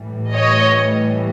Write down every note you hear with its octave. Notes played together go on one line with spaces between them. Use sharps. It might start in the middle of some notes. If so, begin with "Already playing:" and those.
Already playing: A2 E3 G3
C#5 D#5